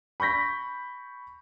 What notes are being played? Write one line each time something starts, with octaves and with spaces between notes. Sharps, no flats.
B5 C#6 G6 A#6 B6